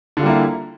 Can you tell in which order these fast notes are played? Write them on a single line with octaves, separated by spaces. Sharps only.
D3 F4 G3 A#3 E4